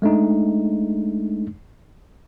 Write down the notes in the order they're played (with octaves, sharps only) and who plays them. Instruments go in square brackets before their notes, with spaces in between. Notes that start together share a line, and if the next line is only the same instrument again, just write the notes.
[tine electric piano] G#3 A3 D4 D#4